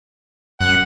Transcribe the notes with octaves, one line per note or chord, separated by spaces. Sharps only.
F#2 F#5